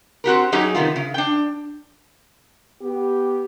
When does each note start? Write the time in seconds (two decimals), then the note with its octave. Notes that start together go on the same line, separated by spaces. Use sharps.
0.24 C4 F#4 G4 A#4
0.52 F#3 C#4 D#4 G4 G#4
0.75 C3 D#3 B3 F4
0.96 C#3
1.14 D4 G5
2.81 B3 G4